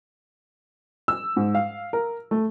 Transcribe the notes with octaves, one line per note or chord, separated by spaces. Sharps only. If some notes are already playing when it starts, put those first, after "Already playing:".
E6
G#2
F5
A#4
A3